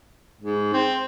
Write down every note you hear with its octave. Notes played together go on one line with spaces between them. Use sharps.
G#2
C4